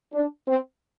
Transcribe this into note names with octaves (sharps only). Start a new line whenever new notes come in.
D4
C4